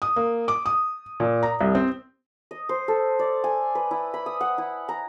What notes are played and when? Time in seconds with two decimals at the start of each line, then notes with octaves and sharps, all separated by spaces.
0.02 D#6
0.16 A#3
0.48 D6
0.66 D#6
1.20 A#2
1.43 A#5
1.61 C2
1.75 C4
2.51 D#5
2.69 C5
2.88 A4
3.19 D5
3.44 G#5
3.75 B4
3.91 E4
4.14 B5
4.26 D#6
4.41 F#5
4.58 E4
4.89 A#5